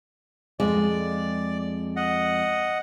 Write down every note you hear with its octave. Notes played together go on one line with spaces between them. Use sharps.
F2 G#3 D5
D#5 F#5